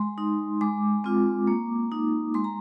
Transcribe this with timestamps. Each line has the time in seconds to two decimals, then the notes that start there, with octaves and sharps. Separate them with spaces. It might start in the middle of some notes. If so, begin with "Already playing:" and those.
Already playing: G#3 C6
0.18 D#4
0.61 G#3 D6
1.04 C4 F4
1.47 A#3
1.92 D#4
2.34 G#3 C6
2.44 A#5